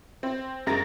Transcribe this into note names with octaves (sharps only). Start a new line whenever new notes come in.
C4
F#2 G#3 A#4 A6 A#6